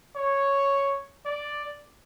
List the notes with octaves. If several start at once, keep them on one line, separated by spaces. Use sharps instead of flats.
C#5
D5